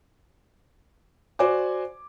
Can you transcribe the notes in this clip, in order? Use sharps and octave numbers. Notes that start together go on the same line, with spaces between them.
F#4 C5 D5 G#5 D6